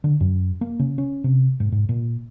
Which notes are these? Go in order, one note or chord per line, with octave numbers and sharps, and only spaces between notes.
D3
F#2
A#3
C#3
C#4
C3
G#2
G#2
A#2